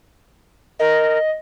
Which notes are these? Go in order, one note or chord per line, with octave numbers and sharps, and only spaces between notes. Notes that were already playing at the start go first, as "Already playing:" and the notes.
A#4 D#5